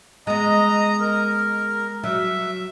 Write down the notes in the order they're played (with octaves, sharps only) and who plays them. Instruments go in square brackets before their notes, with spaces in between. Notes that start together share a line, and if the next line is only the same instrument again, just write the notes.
[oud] G#3 B3 [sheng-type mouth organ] D#5 A#5
[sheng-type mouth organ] A#4
[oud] F#3 [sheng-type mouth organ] E5